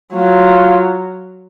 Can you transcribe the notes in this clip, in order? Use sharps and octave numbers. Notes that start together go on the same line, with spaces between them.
F#3 F4